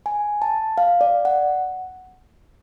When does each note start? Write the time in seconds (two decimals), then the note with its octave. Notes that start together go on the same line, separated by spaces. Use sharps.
0.06 G#5
0.42 A5
0.78 F5
1.01 D5
1.25 F#5